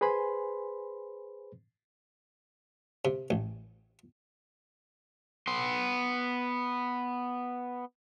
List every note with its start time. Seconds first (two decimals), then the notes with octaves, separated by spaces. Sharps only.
0.01 G#4 B4 C5 G#5 B5 C6
3.05 C3
3.30 A1
5.47 B3 C6